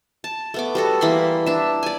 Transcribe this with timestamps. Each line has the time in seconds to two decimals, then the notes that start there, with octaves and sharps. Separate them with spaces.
0.24 A5
0.54 A3 B3 D6
0.75 G3 F#4 A4
1.01 E3 A#3 B5 C6
1.46 D4 E5
1.83 D5 G#5